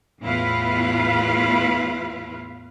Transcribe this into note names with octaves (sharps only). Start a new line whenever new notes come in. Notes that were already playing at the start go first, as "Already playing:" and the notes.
E2 A2 E4 F4 B4 F5